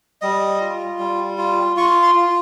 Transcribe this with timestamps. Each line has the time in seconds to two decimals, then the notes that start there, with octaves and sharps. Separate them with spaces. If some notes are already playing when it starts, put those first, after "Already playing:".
0.22 G3 D#5
0.61 F4
0.99 G3
1.38 F4
1.76 F4 C#6
2.03 C6
2.15 F4